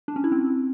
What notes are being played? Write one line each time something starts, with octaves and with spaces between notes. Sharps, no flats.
D4
C#4
E4
C4